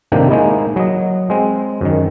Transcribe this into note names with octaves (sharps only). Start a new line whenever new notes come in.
A2 C3 D#3 A#3 D4 G5
G#3 A#3 D#4 E4
F#3 D#5
G#3 C4
F#2 D#3